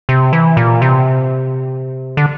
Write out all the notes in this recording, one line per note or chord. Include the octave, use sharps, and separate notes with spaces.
C3
E3
A#2
C3
D3